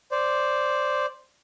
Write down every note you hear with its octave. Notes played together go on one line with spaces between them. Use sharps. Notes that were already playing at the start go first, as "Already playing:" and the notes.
C5 D5